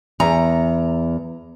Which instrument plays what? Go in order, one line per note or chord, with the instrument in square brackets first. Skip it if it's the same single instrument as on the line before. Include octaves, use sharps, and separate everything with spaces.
[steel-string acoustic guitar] E2 A#5